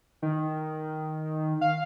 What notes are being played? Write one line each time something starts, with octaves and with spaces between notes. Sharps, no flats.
D#3
F5